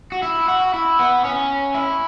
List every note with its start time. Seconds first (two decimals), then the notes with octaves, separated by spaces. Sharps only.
0.12 F#4
0.23 E4
0.48 F#4
0.74 E4
0.99 B3
1.25 C#4
1.74 E4